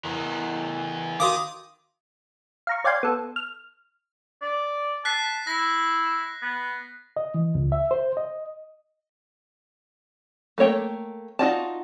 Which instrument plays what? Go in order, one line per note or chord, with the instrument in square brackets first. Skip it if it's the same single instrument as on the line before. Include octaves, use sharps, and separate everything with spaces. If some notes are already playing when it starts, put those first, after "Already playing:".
[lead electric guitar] E2 [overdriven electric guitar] E3 A#4
[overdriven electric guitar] D#3 [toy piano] F#4 A#4 F5 [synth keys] D6 D#6
[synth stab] F5 A#5 C#6
C#5 D5 F5 G5 G#5 C6
B3 A4
F6
[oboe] D5
[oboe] A5 [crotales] F#6 B6 C7
[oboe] E4 [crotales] A#6
[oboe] B3
[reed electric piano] D#5
E3
C#2
E5
C5
D#5
[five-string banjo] A3 A#3 C#5 G5
D#4 F4 F#4 D5 A5